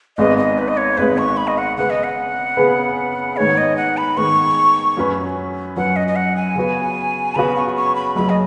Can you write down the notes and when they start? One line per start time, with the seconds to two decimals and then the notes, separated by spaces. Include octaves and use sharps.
0.17 G#1 G#2 G#3 B3 D#5
0.38 D#5
0.58 B4
0.68 D#5
0.77 C#5
0.98 G#1 G#2 G#3 B3 B4
1.18 C#6
1.37 B5
1.47 D#5
1.58 F#5
1.77 C#3 B3 G#4 B4 F#5
1.90 D#5
2.04 F#5
2.57 C#3 B3 G#4 B4
3.37 G#2 D#3 B3 G#4 C#5
3.58 D#5
3.77 F#5
3.97 B5
4.17 G#2 D#3 B3 G#4 C#6
4.97 F#2 F#3 C#4 B4
5.76 F#2 F#3 C#4 B4 F#5
5.96 D#5
6.08 D#5
6.16 F#5
6.36 G#5
6.56 C#3 B3 F#4 B4
7.35 C#3 B3 F#4 B4 B5
7.56 C#6
7.76 C#6
7.95 B5
8.15 F#1 F#2 C#3 F#3 B5
8.30 D#5